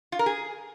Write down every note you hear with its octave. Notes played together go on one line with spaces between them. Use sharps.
F4
A#4
G#4